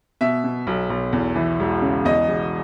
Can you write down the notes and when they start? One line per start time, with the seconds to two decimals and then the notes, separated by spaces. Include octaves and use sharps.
0.21 B2 E5
0.44 B2
0.67 B1
0.90 B1
1.13 E2
1.36 E3
1.59 E1
1.82 C#3
2.05 E2 D#5
2.28 E1